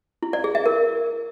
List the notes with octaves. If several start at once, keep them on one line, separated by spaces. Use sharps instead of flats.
E4
D5
G#4
E5
A#4